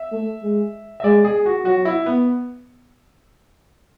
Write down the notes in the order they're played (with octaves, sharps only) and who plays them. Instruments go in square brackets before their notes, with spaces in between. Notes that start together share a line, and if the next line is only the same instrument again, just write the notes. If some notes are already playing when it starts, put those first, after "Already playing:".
Already playing: [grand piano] E5
[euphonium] A3
G#3
[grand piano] E5
[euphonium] G#3 [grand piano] D5
[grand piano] G#4
F#4
[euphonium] F#3 [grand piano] F#4
[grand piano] E4
B3